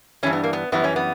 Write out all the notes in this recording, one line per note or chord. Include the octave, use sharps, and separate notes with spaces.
G2 E3 G3 C#4
B3
A#3
B3
F#2 E3 G3 B3
C#4
B3